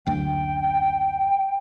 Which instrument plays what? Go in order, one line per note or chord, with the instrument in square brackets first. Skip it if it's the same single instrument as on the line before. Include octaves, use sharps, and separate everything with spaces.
[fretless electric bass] F#1 D2 [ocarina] G5